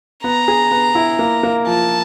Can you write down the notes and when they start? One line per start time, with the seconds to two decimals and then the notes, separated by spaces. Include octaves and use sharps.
0.24 B3 A#5
0.48 G#4
0.71 B3
0.95 E4
1.19 A#3
1.43 A#3
1.67 F3 A5